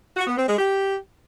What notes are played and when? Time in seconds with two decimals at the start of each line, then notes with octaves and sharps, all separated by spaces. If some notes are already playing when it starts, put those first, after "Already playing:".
0.17 F#4
0.27 B3
0.38 C4
0.48 G#3
0.59 G4